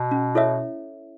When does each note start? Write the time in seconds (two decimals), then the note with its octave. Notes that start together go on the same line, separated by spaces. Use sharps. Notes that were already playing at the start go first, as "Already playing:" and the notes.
Already playing: B2
0.11 C#4
0.35 E4 A4 C#5 E5